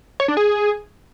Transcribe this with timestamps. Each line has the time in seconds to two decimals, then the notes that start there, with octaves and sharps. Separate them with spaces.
0.20 C#5
0.28 D4
0.37 G#4